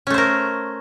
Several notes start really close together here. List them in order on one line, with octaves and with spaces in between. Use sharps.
C#4 A3 C5 A#4